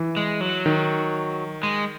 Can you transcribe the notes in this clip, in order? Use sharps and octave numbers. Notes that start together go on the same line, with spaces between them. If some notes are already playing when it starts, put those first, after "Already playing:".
Already playing: E3
G#3
F#3
D#3
G#3